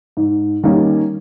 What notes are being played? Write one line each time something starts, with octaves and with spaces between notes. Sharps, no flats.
G#2
D#3 G3 A#3 C#4